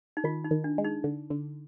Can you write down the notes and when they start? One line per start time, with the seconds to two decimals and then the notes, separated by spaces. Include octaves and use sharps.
0.17 D#4
0.24 D#3 F4
0.44 D#4
0.51 D#3
0.64 D4
0.78 G#3
0.84 D#4
1.04 D3
1.30 D3